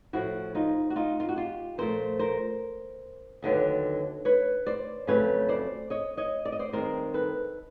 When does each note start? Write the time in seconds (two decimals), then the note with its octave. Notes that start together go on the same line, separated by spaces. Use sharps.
0.13 A2 F3 A3 E4 F#4
0.55 D#4 F4
0.90 F#4
0.96 D#4 F4
1.20 F4
1.29 F#4
1.36 F4 G4
1.78 A#2 F3 A3 A#4 C5
2.19 A#4 C5
3.42 D#2 D3 F#3 B3
4.25 B4 C#5
4.66 C5 D5
5.07 F2 C#3 F#3 A3 B4 C#5
5.49 C5 D5
5.90 C#5 D#5
6.17 C#5 D#5
6.45 D5
6.52 D#5
6.59 C5 D5
6.72 G2 D#3 G#3 C4 A#4 C5
7.14 A4 B4